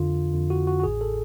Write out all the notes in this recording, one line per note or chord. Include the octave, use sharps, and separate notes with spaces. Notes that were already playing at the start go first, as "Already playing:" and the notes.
Already playing: F2 D3 F4
F2 D3
F#4
F#4
F#4
A1 A2 G#4
A4